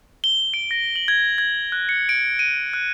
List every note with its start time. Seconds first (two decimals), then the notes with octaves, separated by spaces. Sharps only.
0.24 G7
0.54 D7
0.71 A#6
0.96 F#7
1.08 G#6
1.38 G#6
1.72 F#6
1.89 C#7
2.09 D7
2.39 D#7
2.73 F#6